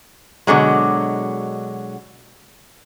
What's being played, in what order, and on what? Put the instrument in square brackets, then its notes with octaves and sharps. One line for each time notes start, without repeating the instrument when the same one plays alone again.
[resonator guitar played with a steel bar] B2 D3 F#3 G#3